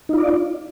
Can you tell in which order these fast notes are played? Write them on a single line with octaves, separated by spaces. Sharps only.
D#4 F4 D5